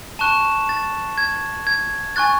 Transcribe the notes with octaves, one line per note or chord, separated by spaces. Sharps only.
A5 C#6 F#6 E7
A6
G#6
G#6
G#5 C#6 F#6 A6